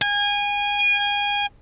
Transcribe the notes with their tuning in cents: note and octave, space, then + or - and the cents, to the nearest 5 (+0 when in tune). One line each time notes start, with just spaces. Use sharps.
G#5 -25